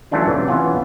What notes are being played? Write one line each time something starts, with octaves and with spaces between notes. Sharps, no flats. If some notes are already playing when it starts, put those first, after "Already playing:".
E3 F#3 A3 C#4 D4 F4
C3 E3
E3 B3 C#4 F4 F#5